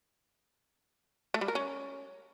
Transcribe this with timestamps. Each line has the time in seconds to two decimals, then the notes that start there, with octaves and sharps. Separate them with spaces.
1.34 A3
1.41 G3
1.48 A#4
1.55 C#4